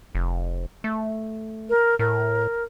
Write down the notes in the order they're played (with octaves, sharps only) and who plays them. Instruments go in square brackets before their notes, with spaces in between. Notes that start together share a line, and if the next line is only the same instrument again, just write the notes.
[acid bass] F1
A3
[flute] A#4
[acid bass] A2 [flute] A#4